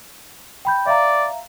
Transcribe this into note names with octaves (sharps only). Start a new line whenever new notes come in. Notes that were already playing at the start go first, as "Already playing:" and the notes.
G5 B5 G6
D5 E5 F5 A#5